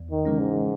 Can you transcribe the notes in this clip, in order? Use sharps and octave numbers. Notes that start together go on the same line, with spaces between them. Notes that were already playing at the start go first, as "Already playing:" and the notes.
Already playing: E2
D#3
C#3 E3 G#3 C#4
G#2